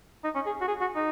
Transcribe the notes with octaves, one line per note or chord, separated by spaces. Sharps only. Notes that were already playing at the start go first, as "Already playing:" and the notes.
D#4
C#4
G#4
F#4
G#4
F#4
D#4